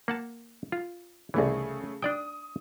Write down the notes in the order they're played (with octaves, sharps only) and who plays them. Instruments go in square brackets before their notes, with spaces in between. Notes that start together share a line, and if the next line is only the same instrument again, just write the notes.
[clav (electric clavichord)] A#3 F#5 A5
F4
[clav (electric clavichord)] C2 E3 [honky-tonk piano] C#3 A3 G#4
[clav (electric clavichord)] D4 D5 G5 [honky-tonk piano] D#6